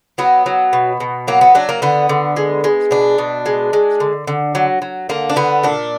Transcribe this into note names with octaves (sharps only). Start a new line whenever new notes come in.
F#3 B3
F#3
B2
B2
F#3 A#3
B3
F#3 D4
A#3
D3 B3
D3
G#3
G#3
B2 D4
B2
G#3
G#3
D3
D3
F#3
F#3
D3 A#3
D4
D3 B3
A#2 D4